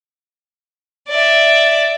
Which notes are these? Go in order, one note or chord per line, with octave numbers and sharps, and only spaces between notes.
D5 E5